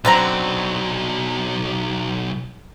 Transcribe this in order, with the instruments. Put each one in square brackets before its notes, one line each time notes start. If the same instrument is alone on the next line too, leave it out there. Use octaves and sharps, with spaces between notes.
[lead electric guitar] B1 F#3 [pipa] D3 C4 A#5